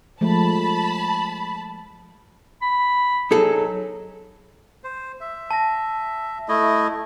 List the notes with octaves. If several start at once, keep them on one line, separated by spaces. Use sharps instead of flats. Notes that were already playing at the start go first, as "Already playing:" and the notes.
F3 G#3 A3 A5 B5
B5
F#3 D#4 G#4 A4
C5
E5
A5 A#6
A3 E4 D#5